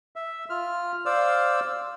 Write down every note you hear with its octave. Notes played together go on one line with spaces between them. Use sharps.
E5
F4 F6
C5 D5 F5 E6